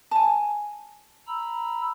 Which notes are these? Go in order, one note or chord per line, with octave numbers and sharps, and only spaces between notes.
G#5 A5
A#5 B5 E6